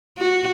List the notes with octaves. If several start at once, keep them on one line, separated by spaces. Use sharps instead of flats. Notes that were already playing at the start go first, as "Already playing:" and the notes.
F#4